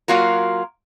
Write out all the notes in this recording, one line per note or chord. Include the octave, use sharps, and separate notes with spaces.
F#3 A#3 F4 F#4 A#4